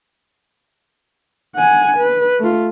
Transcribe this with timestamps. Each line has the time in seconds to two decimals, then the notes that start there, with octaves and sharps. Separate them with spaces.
1.55 F#5 G#5
1.97 B4
2.39 A3 F4